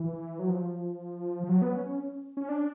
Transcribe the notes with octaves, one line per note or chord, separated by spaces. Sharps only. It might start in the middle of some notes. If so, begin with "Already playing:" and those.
Already playing: E3
F#3
F3
F3
F#3
B3
C#4
C#4
C#4
D4